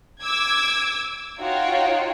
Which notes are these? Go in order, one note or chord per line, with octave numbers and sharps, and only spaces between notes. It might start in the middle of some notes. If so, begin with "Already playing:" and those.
D6 E6 G#6
D#4 F4 F#4 C#5 G5